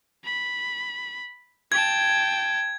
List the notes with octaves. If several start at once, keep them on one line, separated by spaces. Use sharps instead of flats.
B5
G5 A5 G#6